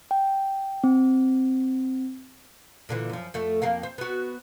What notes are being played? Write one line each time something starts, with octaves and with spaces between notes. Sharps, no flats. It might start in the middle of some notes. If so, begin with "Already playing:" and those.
G5
C4
A#2 D3 E3
F#2 F3
F2 A3 A4
F2 A#3 F5
C5
B3 F#4